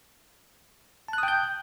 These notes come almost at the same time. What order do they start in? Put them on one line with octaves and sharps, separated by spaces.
A5 F#6 D#6 G5 G6